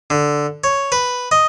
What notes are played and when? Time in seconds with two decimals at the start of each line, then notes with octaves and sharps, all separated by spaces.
0.10 D3
0.64 C#5
0.92 B4
1.31 D#5